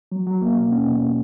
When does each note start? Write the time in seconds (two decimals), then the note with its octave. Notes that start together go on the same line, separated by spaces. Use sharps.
0.12 F#3
0.27 F#3
0.42 A#3
0.57 B2
0.72 C#4
0.87 B2